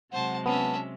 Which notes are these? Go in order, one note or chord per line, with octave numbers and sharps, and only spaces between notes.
C3 F#3 G#3 C5 F#5 A5
B3 C#4 E5 A5